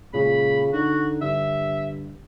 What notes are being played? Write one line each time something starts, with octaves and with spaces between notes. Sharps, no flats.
A#2 C#3 G#3 B5
D3 D#4 F#4
G2 D3 E5